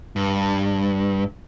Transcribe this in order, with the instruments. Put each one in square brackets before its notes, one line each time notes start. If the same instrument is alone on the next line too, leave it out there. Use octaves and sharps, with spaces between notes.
[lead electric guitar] G2